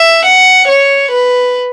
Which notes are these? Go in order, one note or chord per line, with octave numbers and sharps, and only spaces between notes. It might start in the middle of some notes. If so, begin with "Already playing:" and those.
Already playing: E5
F#5
C#5
B4